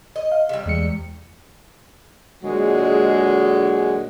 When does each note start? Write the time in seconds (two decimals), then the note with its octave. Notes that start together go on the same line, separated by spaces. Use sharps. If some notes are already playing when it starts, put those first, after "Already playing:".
0.16 D#5
0.32 F5
0.49 C3 G3
0.66 E2 G#3 C#7
2.43 A#2 D3 F#3 G#3